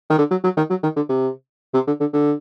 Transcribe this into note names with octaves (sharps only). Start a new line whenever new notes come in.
D#3
D3
F#3
F#3
D#3
F#3
D#3
D3
C3
C3
D3
D3
D3